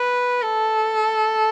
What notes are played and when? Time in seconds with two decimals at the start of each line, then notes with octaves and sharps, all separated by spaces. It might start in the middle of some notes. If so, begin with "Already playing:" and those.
Already playing: B4
0.43 A4